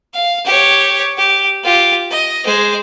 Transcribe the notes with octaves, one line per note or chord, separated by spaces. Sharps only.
F5
G4 C#5
G4
F4 G4
D#5
G#3 C5